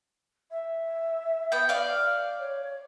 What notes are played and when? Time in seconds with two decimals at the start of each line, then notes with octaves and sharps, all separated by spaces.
0.51 E5
1.52 B3 G5
1.69 D5 F5
2.39 C#5